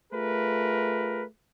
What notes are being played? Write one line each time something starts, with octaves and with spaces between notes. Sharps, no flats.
A3 F4 G#4 A#4 B4